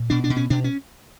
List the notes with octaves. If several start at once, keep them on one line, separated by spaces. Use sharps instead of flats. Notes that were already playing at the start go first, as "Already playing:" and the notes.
Already playing: A#2
B2 D4
D4
B2
C#4
B2 D4
C#4